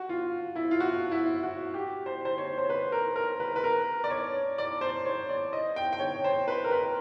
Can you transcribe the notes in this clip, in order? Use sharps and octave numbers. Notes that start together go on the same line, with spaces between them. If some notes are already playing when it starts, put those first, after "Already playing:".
Already playing: F#4
F4
E4
F4
F#4
E4
F#4
G4
C5
C5
C#5
C5
B4
A#4
A#4
B4
B4
A#4
D5
C#5
D5
C5
C#5
D5
D#5
G5
G5
C#5
C5
B4
A#4
B4